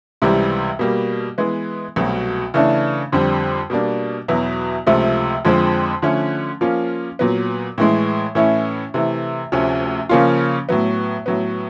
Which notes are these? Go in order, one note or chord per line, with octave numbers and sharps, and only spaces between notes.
C#2 C3 E3 G3
B2 G3 A#3
E3 G#3 B3
C2 B2 F#3 A3
C#3 E3 A3 D4
F2 D3 G3 C4
B2 G3 A#3 D4
E2 B2 F#3 B3 E4
C#2 C3 F3 A3
F2 D3 F3 G#3 C4
D3 F3 A3 C#4
F3 A#3 C#4 F4
A#2 F#3 B3
A2 E3 G#3
A2 E3 A3 C#4 E4
C3 E3 A3
D2 C3 F3 A3 C#4
C#3 F3 A#3 C#4 F4
A2 F#3 B3
A2 F#3 B3